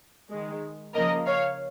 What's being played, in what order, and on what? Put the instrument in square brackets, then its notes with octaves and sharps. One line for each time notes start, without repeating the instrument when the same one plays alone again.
[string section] D#3 G#3
C#3 F3 A#3 A#4 D#5
C#5 F5